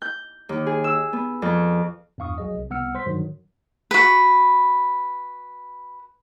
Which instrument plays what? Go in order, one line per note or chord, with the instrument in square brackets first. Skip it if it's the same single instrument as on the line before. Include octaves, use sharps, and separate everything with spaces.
[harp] G6
D#2
G#4
E6
B3
F2
[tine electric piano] E2 G2 F5 C#6 D#6
A#1 F#3 G#4 D#5
C2
C2 B3 F#5 E6 F6 C#7
C5 C6 B6
G2 D#3 F#3
[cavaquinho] F#4 B4